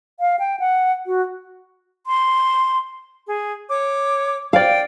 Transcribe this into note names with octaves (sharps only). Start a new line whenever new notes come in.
F5
G5
F#5
F#4
C6
G#4
C#5 D6
D5 F5 G5